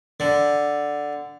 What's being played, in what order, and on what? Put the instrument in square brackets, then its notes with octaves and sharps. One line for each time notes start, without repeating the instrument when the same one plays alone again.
[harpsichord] D3